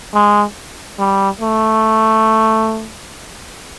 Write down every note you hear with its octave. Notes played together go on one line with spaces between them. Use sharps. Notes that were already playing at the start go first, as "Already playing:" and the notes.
G#3
G3
A3